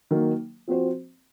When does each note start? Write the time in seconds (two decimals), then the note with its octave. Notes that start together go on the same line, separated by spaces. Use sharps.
0.11 D#3 F#3 A#3
0.68 F3 C4 F#4 C5